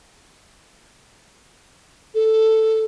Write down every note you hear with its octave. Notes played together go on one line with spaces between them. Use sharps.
A4